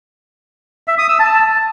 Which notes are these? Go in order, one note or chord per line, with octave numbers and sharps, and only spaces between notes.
E5
D#6
E6
A5